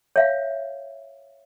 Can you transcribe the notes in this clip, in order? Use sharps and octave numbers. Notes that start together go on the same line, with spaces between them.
C#5 E5 F5